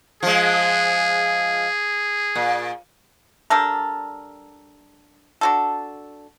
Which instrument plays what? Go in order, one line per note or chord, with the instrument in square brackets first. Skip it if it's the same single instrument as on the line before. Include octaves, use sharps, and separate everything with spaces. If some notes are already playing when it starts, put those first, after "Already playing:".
[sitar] F3 G#3 [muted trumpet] G#4
[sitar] A#2
[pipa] G3 D4 A4 A#4
D4 F#4 A4